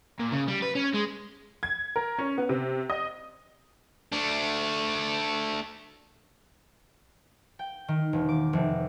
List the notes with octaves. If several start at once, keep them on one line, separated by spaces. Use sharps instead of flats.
A#2
C#3
G3
B4
C#4
G#3
G#6
A#4
C#4
B3
C3
D#5
A3 D4
G5
D#3
E1
D6
F1